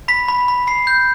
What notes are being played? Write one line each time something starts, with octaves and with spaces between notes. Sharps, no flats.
B5 B6
B5
B5
B5 C7
G6